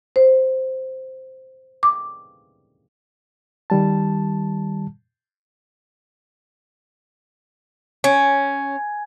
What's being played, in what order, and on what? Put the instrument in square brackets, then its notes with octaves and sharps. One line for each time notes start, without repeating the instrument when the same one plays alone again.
[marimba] C5
D6
[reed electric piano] D#3 G3 A5
[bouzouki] C#4 [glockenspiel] G#5 G#6